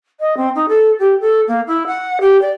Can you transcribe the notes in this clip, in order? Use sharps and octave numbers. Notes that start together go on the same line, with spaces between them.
D#5
C4
D#4
A4
G4
A4
A#3
E4
F#5
G4
D5